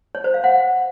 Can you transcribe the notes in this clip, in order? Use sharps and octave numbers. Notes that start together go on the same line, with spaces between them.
C#5
C5
F5
F#5